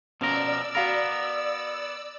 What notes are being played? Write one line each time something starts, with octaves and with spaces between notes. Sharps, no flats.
B2 F3 C#4 A#4 D5 E6
B3 F#4 A#4 F5 B5